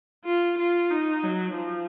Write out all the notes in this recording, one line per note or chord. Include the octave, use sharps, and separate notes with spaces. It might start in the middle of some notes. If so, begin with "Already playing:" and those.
F4
F4
D#4
F#3
F3